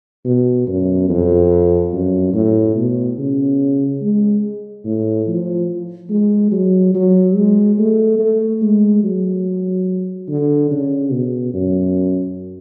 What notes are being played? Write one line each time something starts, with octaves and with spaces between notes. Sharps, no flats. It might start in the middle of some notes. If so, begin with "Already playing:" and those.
B2
F#2
F2
F#2
A2
B2
C#3
G#3
A2
F3
G#3
F#3
F#3
G#3
A3
A3
G#3
F#3
D3
C#3
B2
F#2